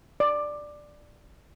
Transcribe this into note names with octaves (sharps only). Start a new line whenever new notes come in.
D5